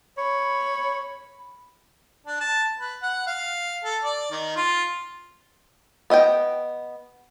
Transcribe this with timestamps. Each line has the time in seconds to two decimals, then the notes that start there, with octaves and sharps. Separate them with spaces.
0.18 C#5 B5
2.27 D4
2.41 A5
2.79 B4
3.02 F#5
3.27 F5
3.84 A4
4.04 D5
4.31 D#3
4.56 F4
6.10 B3 D#5 E5 G5